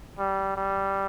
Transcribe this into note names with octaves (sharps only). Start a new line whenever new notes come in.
G3
G3